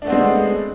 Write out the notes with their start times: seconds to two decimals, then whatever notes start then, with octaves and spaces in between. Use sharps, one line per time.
0.02 D4
0.04 A3
0.07 B3
0.10 C4
0.12 G#3